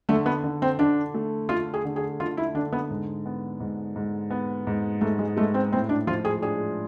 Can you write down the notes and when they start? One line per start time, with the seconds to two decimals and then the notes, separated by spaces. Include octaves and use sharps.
0.09 D3 A3
0.26 B3
0.44 D3
0.62 C4
0.79 D3 D4
1.14 A3
1.49 A3 F4
1.74 G#4
1.85 D3
1.96 G#4
2.20 D3 F4
2.37 E4
2.54 D3 D4
2.72 B3
2.90 G#2
3.26 B3
3.60 G#2
3.96 G#2
4.31 B3
4.67 G#2
5.01 G#2 A3
5.19 G#3
5.36 G#3 A3
5.54 C4
5.72 A2 C4
5.89 D4
6.07 F3 F4
6.25 G#4
6.42 D4 G#4